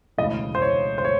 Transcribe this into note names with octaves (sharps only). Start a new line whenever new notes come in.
E1 D2 C#3 E3 D#5
C5
C#5
C5
C#5